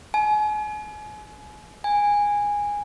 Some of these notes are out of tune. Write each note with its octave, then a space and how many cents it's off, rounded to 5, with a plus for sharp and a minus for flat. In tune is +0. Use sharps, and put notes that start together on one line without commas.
G#5 +35
G#5 -15